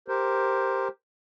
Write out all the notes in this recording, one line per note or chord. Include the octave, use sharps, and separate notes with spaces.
G4 A#4 C5